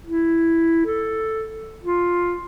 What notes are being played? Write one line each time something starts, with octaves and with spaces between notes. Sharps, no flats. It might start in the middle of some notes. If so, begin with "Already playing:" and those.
E4
A4
F4